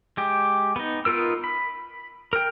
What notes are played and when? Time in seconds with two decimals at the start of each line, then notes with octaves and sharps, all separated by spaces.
0.17 G#3 G4
0.76 B3 D#4
1.05 B3 D#4 F4 A#4 E6
1.44 B5
2.33 A#4 G5